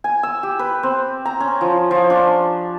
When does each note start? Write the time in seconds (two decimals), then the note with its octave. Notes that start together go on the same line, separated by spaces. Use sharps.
0.04 G#5
0.23 E6
0.43 G4
0.59 B4
0.83 C4
1.25 A#5
1.40 C#4
1.61 F3
1.91 F3
2.10 D4